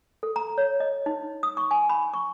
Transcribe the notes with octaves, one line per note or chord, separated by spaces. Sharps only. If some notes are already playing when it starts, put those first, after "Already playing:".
A4
A#5
C#5
D#5
D#4
D#6
C#6
G#5
B5
C#6